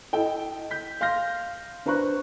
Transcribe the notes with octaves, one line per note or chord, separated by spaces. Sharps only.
E4 A4 D#5 G5
G6 B6
F5 C6 F6 G6 A#6
D4 B4 C5 A#5 C#6 F#6